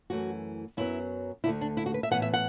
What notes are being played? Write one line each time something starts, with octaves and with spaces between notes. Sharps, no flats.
F#2 E3 A3 F#4
F#2 F#3 B3 E4
D2 D3 A3 E4
D4
E4
F#4
B4
E5
A2 E3 B3 F#5
E5
F#5